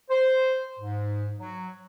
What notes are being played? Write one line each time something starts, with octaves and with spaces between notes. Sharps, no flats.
C5
G#2
F#3